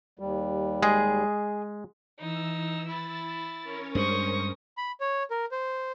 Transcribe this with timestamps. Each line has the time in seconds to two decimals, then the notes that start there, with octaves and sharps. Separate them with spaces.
0.19 D#2 G3
0.83 G#3 G#4
2.19 E3 D#4 E6
2.88 E4 A6
3.63 C#4 A#4 C#5
3.95 G2 G#3 C5 C#6 D#6
4.77 B5
5.01 C#5
5.31 A#4
5.52 C5